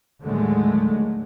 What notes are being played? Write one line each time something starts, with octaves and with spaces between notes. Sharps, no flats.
D#2 A2 D3 F#3 G#3 A3